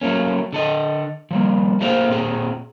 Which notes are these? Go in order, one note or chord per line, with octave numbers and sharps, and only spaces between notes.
F#3 A3 A#3 C#4
D3 A4 D#5
F3 G3 A#3
A3 A#3 G#4 C5 D5 F5
A#2 C4 G#4